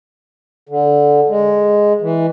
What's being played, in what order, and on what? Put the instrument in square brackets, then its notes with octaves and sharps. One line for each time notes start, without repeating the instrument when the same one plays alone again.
[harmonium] D3
G#3
E3